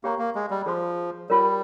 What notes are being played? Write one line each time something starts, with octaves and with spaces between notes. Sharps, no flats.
A#3 G4 C#5 G5 A#5 C#6
A#3
G#3
G3
F3 G#4 C5 F5 C6
G3 F4 A#4 C#5